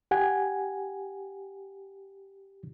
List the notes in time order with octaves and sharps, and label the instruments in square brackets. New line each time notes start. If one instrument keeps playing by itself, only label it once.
[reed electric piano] G4 F#5 G#5